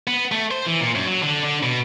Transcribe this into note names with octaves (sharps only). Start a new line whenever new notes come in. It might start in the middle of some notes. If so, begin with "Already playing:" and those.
B3
A3
C5
E3
A#2
F#2
F#3
D3
D3
B2